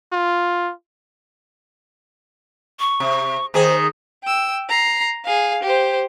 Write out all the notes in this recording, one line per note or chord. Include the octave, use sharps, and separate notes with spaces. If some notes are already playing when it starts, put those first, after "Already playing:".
F4
C#6
C3
D#2 D#3 G#4 C5
G5 E6
A#5 C7
G#4 F5
G4 C5